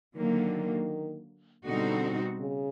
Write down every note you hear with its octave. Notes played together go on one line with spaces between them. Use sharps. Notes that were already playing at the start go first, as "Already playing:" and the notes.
D3 D#3 F#3 A#3
B2 D3 G3 C4 D#4 F#4
C#3